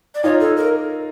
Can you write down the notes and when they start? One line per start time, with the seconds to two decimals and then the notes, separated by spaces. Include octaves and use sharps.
0.15 D5
0.24 D#4 F4 C#5
0.40 A4
0.57 A#4